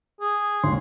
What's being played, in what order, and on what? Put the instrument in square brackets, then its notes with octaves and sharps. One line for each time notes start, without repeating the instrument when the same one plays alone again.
[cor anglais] G#4
[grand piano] G#1 D#2 [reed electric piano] D3 C6